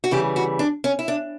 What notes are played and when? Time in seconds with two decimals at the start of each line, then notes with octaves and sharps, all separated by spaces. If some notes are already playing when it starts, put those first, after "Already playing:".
0.04 F#4
0.11 C#3 E3 G3 G4
0.36 F#4
0.59 D4
0.84 C#4
0.99 E4
1.08 D4